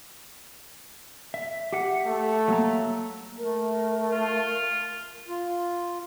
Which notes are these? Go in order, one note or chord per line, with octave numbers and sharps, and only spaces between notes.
E5
G4 E5 F#5
A3
F#3 A#3 A#5
A3 A#4
F4
F4